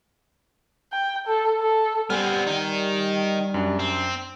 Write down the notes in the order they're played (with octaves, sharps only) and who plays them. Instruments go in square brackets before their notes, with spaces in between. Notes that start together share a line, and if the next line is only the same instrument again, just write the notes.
[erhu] G5
A4
A4
[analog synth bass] G3 [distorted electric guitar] B3 C4 [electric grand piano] G#5 F6
[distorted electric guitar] D#3 D#4
[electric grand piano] F#2 D4
[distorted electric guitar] C4